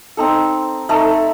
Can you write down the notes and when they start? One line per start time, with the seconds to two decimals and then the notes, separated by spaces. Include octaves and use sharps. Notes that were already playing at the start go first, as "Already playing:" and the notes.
0.17 C4 D#4 A4
0.89 A3 D#4 A4